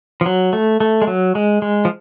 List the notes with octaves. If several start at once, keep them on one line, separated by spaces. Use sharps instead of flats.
F3
F#3
A3
A3
G#3
F#3
G#3
G#3
F3